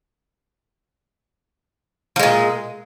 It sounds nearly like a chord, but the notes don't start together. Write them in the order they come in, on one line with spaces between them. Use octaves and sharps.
F3 G#3 A#2